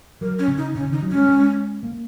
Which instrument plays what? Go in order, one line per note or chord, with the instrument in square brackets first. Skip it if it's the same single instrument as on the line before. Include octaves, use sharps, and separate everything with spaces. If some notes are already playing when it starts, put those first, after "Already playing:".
[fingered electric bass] F#3 [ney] A#4
[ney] C#4
[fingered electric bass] C#3
[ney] D#4
[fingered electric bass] C#3 [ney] C#4
[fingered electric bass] D#3 [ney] D#4
[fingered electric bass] F#3
[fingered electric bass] G#3 [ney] C#4
[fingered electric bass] G#3
A#3